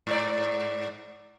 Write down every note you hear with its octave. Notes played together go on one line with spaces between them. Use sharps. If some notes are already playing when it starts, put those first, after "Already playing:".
G#2 D5